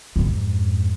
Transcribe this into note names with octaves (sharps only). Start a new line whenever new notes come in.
F2 G#2